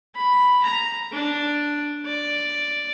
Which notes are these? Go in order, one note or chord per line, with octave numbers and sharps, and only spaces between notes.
B5
A#5
D4
D5